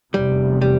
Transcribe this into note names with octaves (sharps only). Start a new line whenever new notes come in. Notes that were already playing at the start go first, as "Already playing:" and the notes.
F1 E2 C3 G3
G3